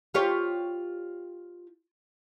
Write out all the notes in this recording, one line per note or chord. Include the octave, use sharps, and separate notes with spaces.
F4 G4 C#5